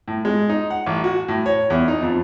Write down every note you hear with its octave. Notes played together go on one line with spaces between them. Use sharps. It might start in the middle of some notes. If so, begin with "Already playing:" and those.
A2
G#3
D#4
F#5
A1
F#4
A2
C#5
E2
D#4
F2